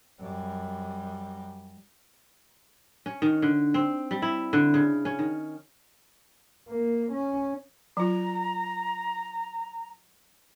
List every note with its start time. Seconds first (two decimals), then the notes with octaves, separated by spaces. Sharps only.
0.21 F#2 G3
3.06 C#4
3.22 D#3
3.42 D3
3.74 C4
4.11 G3
4.22 E4
4.53 D3
4.74 C#3
5.05 C#4
5.19 D#3
6.69 A#3
7.12 C#4
7.97 F#3 F4 A#5